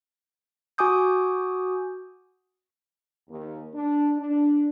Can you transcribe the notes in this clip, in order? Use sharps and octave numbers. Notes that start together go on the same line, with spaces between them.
F#4 G#5 D6 D#6 G6
D#2
D4
D4